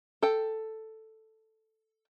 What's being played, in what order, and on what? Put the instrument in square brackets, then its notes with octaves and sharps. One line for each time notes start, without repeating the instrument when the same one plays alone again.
[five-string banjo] A4 G5